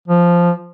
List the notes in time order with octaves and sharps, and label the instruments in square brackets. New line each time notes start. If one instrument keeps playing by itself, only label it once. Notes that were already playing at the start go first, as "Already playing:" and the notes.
[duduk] F3